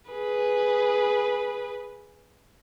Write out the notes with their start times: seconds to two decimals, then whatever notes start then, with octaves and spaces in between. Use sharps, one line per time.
0.11 G#4 B4